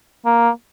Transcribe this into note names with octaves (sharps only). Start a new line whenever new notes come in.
A#3